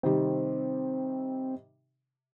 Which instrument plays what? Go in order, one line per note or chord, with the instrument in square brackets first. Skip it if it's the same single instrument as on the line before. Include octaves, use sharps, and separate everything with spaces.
[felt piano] C3 D#3 G3 [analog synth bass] C4